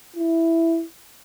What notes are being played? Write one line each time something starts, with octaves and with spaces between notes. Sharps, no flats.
E4